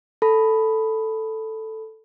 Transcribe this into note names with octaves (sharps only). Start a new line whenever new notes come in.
A4 B5